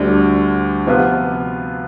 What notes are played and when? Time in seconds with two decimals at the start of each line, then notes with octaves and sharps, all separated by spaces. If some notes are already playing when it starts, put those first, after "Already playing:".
Already playing: D2 D3 G3 D4
0.87 C3 F3 B3 F4